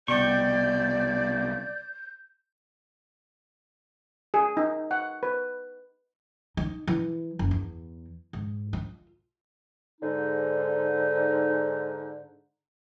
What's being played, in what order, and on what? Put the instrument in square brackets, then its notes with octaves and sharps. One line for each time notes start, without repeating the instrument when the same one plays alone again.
[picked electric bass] C2 B2 [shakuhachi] D5 [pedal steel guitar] G5 C#6 [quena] G6
[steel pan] G#4
D#4
F#5
B4
[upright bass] D#4
E3
F#1
E2
G#2
F4
[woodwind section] G#2 D3 D#4